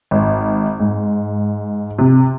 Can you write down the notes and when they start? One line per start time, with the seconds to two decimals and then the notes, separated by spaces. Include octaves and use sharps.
0.11 G#1
0.80 G#2
1.98 C3